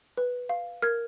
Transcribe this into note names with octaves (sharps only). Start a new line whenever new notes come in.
B4
F5
A#4 F6 G#6